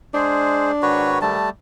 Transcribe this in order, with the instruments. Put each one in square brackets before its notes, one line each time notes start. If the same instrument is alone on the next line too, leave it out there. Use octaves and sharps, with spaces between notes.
[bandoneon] G#3 G#4 C5 [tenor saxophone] D4
[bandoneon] G#2 D#3 [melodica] F#4 B4 C#5
[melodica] G3 A3 A5